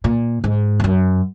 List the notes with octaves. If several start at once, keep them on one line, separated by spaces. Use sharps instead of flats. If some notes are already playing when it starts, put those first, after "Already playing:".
A#2
G#2
E2
F#2